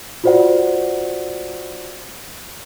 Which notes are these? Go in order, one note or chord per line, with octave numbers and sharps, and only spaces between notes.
F4 F#4 C5 D5 F#5